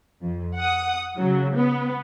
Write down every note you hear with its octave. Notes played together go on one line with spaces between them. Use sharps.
F2
F#5 D#6
C#3 F#3
B3